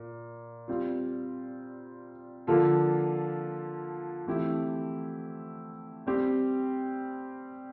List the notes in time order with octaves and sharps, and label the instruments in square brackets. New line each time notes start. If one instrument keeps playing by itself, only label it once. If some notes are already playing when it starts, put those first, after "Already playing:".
Already playing: [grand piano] A#2
G3 C4 F4
D3 F3 A#3 F4 A4
E3 A3 C4 E4 G4
G3 C4 G4